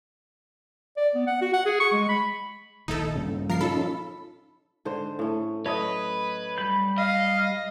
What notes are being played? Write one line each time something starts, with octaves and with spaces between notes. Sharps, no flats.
D5
B3
F#5
F#4
F#5
G#4
C#6
G#3
B5
A#1 D#2 D#4 E4 A4
G2 A#2 C#3
F3 A#4 A#5 C7
C#4 D#4 F4 A4 B5
G#2 D3 C5
A2 C#4
F#3 A3 B4 C#5 D#5 D#6
G3 B5 G6
D#5 F5